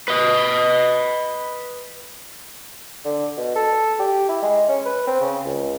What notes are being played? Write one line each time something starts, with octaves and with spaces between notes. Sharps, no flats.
B4 D#5
D3
B2
A4
G4
E4
G#3
C#4
B4
C4
C#3
C#2